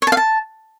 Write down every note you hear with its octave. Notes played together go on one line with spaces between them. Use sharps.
C#5
A5
F5
A5